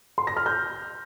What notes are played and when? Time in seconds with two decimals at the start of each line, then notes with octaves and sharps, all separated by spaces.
0.18 C6
0.27 A#6
0.37 F6
0.46 G6